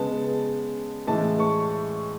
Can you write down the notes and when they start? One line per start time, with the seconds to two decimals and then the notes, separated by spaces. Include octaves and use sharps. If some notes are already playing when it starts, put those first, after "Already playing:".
Already playing: C#3 G#3 B3 A5
1.07 A2 E3 G#3 A5
1.40 C#6